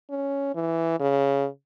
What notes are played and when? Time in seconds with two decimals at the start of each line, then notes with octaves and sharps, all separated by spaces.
0.10 C#4
0.55 E3
1.00 C#3